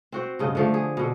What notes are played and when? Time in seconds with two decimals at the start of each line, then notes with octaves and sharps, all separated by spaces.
0.12 C4 F#4 C5
0.39 G2 C#3 D#5
0.55 D3 F3 A3
0.74 G#4
0.97 B2 D3